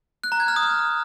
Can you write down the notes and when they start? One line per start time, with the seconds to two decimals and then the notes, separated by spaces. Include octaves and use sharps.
0.24 F#6
0.32 A#5
0.40 G#6
0.48 F6
0.56 D#6